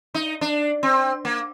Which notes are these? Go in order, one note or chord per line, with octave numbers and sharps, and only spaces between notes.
D#4
D4
C4
A#3